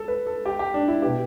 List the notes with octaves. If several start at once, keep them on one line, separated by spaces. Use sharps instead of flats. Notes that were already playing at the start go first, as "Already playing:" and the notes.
Already playing: A4
B4
A4
G4
G4
D4
E4
B2 B3 G4